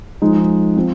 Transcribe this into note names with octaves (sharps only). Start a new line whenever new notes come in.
F3 G#3 D#4
F3 C4